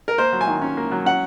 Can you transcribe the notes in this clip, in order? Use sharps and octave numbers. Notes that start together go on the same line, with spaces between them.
A#4
A#3 C5
F#3
G#5
D#3
C#4
A#3
F#3
C#4 F#5